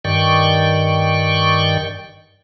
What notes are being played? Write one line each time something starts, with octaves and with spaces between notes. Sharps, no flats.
G2 D#3 D5 G5 C#6